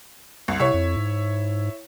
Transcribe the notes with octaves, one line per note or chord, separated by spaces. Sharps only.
C2
C3 E4 C#5
F2
G#2